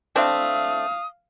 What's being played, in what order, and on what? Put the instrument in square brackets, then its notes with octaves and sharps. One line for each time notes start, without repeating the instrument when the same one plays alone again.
[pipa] A3 C4 D4 [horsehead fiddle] F5 [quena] D#6